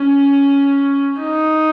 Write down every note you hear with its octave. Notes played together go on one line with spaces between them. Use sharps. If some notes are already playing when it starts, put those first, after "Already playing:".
Already playing: C#4
D#4